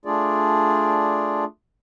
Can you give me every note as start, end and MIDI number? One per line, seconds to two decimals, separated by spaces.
0.05 1.45 57
0.05 1.45 62
0.05 1.45 65
0.05 1.45 68
0.05 1.45 74